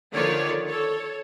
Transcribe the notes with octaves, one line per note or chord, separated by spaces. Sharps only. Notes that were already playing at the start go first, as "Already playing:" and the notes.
D3 D#3 F3 C#5 D5
A4 C#5